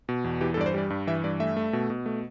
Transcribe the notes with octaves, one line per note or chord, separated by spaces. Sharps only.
B2
E2
E3 G4
A4
G2 D5
C5
G3 D5
G2
E3 E5
G2 D5
A3 E5
A3
B2
B2
A3